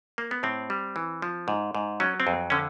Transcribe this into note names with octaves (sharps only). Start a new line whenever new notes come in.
A#3
B3
A2 C4
G3
E3
F3
G#2
G#2
F#3 C#4
C4
F2
D3 C#4